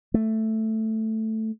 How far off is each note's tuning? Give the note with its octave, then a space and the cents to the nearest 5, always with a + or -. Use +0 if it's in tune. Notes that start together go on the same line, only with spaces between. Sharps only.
A3 +0